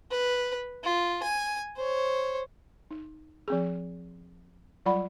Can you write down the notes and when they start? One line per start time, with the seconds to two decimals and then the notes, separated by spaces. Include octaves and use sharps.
0.11 B4
0.84 F4
1.23 G#5
1.76 C5 C#5
2.91 D#4
3.48 F3 C4 G#4
4.86 F#3 G3 F4 D5 F#5 B5